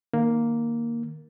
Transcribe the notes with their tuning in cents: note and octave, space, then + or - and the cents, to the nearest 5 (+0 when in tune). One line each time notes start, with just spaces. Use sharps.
D#3 -20 A#3 +0